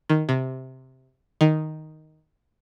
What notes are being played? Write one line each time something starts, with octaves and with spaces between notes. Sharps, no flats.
D#3
C3
D#3